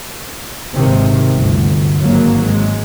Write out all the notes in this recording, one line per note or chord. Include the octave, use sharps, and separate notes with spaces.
G#1 C3 D#3
G1 D2
G#1 F#3 A#3
G#3